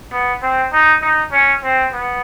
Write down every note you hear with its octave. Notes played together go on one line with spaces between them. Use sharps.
B3
C4
D#4
D#4
C#4
C4
B3